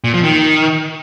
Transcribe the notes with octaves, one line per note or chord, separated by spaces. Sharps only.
A#2
F3
D#3